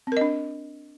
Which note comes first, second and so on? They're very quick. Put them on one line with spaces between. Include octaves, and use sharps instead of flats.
C4 A#4 D#5 D4